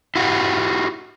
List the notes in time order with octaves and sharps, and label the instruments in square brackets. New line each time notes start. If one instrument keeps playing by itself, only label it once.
[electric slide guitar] E4 F#4 G4